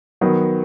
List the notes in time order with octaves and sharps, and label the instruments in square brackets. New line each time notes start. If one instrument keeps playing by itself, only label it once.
[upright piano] D#3 F#3 B3